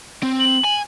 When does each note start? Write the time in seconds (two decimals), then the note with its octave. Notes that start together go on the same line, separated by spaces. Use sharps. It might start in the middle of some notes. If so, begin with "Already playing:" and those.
0.23 C4
0.40 F#7
0.64 G#5